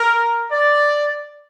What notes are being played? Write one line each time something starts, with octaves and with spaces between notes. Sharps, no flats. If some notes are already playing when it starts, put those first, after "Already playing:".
Already playing: A#4
D5